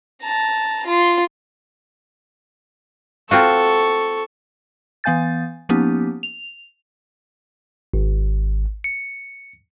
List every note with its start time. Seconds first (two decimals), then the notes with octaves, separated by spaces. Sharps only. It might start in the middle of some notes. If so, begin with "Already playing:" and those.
0.22 A5 A#5
0.86 F4 C6
3.31 C4 F4 F#4 A4 C#6
5.04 E3 B3 F5 G#5 G6 A6
5.69 F3 A#3 B3 C#4 D#4 G4
6.23 F7
7.94 G#1
8.84 C#7